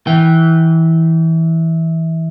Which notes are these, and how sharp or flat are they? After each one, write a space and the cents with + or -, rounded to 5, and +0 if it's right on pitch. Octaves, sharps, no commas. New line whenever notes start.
E3 -20 G5 -20